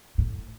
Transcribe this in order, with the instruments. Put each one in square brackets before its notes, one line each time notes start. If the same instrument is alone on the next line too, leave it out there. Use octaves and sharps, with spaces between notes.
[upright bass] A2